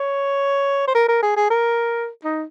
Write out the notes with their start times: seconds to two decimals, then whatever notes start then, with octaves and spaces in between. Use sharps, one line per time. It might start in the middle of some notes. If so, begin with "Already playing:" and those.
Already playing: C#5
0.88 C5
0.95 A#4
1.09 A#4
1.23 G#4
1.37 G#4
1.51 A#4
2.24 D#4